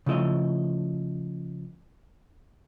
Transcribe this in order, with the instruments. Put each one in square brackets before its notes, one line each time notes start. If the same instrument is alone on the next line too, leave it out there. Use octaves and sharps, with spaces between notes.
[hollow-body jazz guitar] C#3 F3 A3 E4 D#5